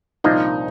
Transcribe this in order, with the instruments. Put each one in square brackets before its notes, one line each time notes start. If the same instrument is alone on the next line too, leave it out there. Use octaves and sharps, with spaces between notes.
[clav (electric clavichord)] C2 A#2 F3 A#3 D4 [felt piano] D#4